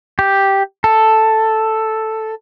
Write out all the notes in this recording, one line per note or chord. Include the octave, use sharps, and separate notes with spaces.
G4
A4